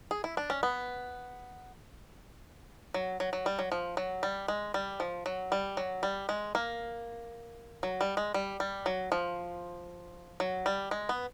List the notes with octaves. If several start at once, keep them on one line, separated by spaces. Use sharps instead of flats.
G#4
E4
D4
C#4
B3
F#3
F#3
F#3
G3
F#3
F3
F#3
G3
G#3
G3
F3
F#3
G3
F#3
G3
G#3
A#3
F#3
G3
G#3
G3
G3
F#3
F3
F#3
G3
G#3
B3